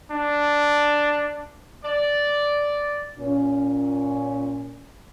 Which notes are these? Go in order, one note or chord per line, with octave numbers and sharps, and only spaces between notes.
D4
D5
A#2 C#4